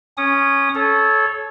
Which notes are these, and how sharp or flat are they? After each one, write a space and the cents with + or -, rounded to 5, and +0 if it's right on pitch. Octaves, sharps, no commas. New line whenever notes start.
C#4 +0 D#6 -20
A4 -20 C#5 +0